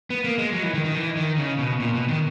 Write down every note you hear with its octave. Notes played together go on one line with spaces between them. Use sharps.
B3
A#3
G#3
F#3
E3
D#3
D#3
E3
D#3
C#3
B2
A#2
B2
D#3